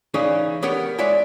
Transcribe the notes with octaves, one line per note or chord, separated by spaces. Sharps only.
C#3 E3 C#4 D#4 G#4 D5
B3 G4 A#4 C#5 F#5
G#3 E4 C#5 D5 E5 G#5